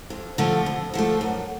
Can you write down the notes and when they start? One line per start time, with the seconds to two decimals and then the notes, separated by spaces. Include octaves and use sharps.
0.10 F2
0.38 D3 F3 A3
0.66 F2
0.94 D3 F3 A3
1.21 F#2